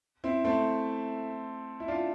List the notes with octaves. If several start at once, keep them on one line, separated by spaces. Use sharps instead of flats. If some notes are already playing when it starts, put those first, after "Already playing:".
C4 E4
A3 C4
E4
D4 F4